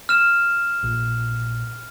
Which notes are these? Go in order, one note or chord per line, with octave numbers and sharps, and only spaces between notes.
F6 E7
A#1 A#2